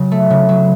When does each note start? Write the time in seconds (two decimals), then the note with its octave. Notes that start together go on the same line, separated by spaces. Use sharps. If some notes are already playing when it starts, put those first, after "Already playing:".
Already playing: C#3 F#3
0.11 A3
0.30 C#3
0.49 F#3